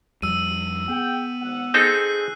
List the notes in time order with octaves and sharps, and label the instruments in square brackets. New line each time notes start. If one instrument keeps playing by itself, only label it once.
[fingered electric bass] F2 G3 [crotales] E6 D#7
[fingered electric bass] B3 [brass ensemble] G#4 F#5 G5
[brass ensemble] G#1 F#5
[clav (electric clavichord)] C4 D#4 A4 [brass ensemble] G#4 [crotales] F#6 C7